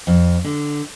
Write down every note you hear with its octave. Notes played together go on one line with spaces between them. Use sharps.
F2
D3